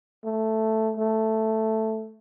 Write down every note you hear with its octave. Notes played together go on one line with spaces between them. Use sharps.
A3
A3